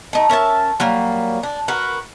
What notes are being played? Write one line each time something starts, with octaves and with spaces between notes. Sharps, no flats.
A3 D#4
C#4 A#4 E5 A5
F#3 G3 A#3
D4
F#4 A#4 B4